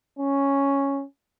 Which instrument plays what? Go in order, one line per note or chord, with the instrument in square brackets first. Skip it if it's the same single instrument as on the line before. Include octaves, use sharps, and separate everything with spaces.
[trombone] C#4